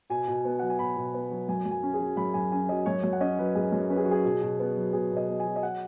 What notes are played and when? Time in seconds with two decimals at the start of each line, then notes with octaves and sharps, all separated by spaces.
0.10 B2 G#5
0.28 B2
0.45 B3
0.59 F#3 F#5
0.70 G#5
0.79 B2 B5
0.97 B2
1.14 B3
1.31 F#3
1.49 F#2 G#5
1.66 F#2
1.71 G#5
1.83 C#4
1.94 G#4
2.01 F#3
2.17 F#2 B5
2.34 F#2 G#5
2.52 C#4 G#5
2.69 F#3 D#5
2.86 F#2 C#5
3.03 F#2 C#5
3.13 F#5
3.20 C#4 D#5
3.39 F#3 B4
3.55 F#2 G#4
3.72 F#2
3.90 C#4 B4
3.97 G#4
4.05 F#4
4.08 F#3 G#4
4.24 B2
4.42 B2
4.59 B3
4.76 F#3
4.93 B2 G#4
5.11 B2
5.17 D#5
5.28 B3
5.40 G#5
5.45 F#3
5.56 D#5
5.63 F#5